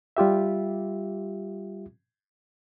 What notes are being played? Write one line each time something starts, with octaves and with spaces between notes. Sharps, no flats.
G3 F4 G4 E5